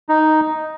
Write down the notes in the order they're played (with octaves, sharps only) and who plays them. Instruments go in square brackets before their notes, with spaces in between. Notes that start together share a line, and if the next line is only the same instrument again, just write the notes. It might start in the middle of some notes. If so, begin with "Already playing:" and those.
[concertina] D#4